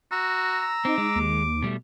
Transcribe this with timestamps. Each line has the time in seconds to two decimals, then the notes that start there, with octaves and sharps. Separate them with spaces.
0.11 F#4 A#5 E6
0.85 C4 D#4 D6
0.98 G#3
1.16 D#2
1.62 B2 G3 A3